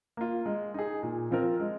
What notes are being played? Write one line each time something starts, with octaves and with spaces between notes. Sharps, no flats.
A#3 F4
G#3
D#4 G#4
A#2
F3 C4 F4 A#4
G#3